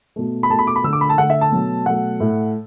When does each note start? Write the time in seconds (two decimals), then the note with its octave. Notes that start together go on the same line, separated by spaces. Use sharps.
0.16 B2 A3
0.43 B5
0.50 B2 A3 A5
0.59 B5
0.67 D6
0.76 B5
0.84 D3 A3 E6
0.93 D6
1.01 B5
1.10 A5
1.18 D3 A3 F#5
1.30 E5
1.41 A5
1.52 B2 F#3 A3
1.86 B2 F#3 A3 F#5
2.20 A2 A3